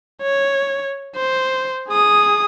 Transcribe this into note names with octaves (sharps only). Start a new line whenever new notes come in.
C#5
C5
G#4 D#6